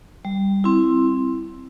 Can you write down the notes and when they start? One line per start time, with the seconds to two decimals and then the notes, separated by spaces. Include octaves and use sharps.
0.25 G3
0.64 C4 E4